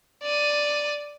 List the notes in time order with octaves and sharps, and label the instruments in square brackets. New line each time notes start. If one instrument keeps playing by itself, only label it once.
[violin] D5 D#7